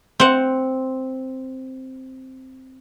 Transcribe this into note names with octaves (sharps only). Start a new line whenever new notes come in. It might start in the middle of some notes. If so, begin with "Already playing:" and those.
C4 F#5